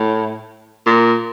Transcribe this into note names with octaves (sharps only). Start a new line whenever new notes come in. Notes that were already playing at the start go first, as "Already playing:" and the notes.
Already playing: A2
A#2